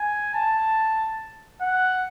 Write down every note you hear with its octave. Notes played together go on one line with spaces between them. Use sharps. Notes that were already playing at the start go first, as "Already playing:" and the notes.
Already playing: G#5
A5
F#5